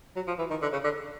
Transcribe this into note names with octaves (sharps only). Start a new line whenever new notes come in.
F#3
F3
E3
D#3
D3
C#3
D3